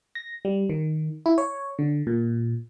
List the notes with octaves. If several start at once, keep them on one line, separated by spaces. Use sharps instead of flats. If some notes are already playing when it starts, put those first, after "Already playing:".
A#6
G3
D#3
E4
C#5
D3
A#2